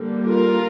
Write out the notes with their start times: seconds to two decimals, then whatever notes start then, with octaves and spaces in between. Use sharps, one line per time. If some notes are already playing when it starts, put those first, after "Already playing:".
Already playing: D3 G3 A#3
0.25 F4 A#4